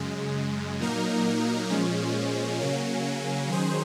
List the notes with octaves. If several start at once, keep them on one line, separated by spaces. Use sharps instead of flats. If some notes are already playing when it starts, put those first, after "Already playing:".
Already playing: F#2 C#3 G#3
A#2 F#3 A#3 D#4 A#4
A#2 F3 G#3 C#4
C#3 F#3 A#3 C#4
D#3 F#3 C#4 G#4 C5